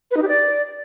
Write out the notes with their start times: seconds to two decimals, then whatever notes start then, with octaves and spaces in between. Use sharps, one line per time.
0.11 B4
0.17 D#4
0.22 G4
0.28 D5